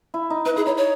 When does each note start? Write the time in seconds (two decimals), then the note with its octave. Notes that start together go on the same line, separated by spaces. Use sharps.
0.14 E4
0.30 D#4
0.45 D#4 B4
0.56 E4 G#4
0.66 D#4 C#5
0.77 C#5